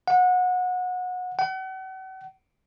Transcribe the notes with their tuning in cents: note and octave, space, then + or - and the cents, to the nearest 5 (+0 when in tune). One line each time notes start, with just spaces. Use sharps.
F#5 -25
F#5 +40